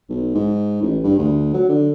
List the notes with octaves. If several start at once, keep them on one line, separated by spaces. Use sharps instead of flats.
B1
G#2
A1
G2
D2
F#3
D3